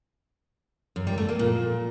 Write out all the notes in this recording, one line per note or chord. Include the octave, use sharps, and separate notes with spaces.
F#2
G3
A3
A#3
A#2